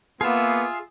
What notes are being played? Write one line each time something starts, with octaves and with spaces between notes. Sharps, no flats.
A#3 B3 F4 G#4 E5